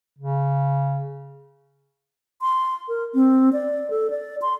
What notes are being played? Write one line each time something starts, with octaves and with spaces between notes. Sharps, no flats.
C#3
C6
A#4
C4
D5
A4
D5
C6